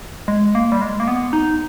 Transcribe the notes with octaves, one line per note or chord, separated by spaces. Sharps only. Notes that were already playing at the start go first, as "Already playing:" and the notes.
G#3
A#3
G3
G#3
A#3
B3
D#4